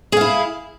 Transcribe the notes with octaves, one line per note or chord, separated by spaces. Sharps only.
E4 G#4 F5